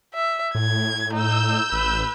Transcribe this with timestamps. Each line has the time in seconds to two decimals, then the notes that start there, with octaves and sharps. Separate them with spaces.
0.14 E5
0.55 A2 G#6
1.13 D#4 E6 G6
1.73 A1 B4